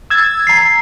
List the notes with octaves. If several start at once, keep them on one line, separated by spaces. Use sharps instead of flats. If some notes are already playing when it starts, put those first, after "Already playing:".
E6 G#6 A6
A#5 C7